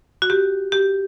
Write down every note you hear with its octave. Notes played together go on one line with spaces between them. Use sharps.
F#4
G4
G4